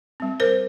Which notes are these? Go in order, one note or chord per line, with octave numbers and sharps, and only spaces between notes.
G3 C4
A#4 C5